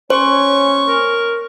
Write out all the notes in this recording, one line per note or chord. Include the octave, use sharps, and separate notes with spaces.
C#4 C5 C#5 C#6
A#4